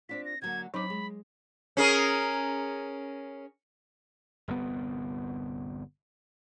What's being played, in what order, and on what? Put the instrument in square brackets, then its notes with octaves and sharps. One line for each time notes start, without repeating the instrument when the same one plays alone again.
[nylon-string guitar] C4 D4 F4 [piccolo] B6
[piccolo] A#6
[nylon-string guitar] D3 F#3 A#3 [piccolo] G#6
[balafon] F#3 D6 [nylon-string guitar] C4 C#4 D#4 [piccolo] B5
[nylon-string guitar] G#3
[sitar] C#4 G#4 A#4
[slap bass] G1 C2 A#2 B3